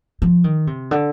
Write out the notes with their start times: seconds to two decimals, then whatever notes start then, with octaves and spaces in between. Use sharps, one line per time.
0.22 F3
0.44 D#3
0.67 C3
0.91 D3